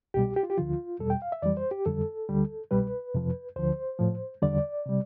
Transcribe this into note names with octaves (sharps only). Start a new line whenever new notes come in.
C2 B2 G3 G4
G4
F4
G4
D2 D3 F3 F4
E2 B2 G3 A4
G5
F5
E5
F2 E3 G3 D5
C5
G4
F2 D3 G3 A4
D2 D3 G3
C2 B2 G3 B4
F2 C3 F3
D2 D3 F3 C5
A2 F3
E2 D3 G3 D5
C3 G3